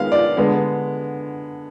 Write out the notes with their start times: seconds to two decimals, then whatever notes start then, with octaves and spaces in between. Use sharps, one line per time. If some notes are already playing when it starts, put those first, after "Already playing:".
Already playing: D#3 G#3 B3 F5
0.12 D5
0.37 D3 G#3 B3